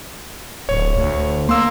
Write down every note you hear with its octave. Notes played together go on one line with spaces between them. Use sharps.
D1 C#5
D2
A#3 C6 E6